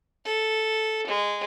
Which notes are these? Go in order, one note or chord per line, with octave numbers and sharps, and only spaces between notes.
A4
G#3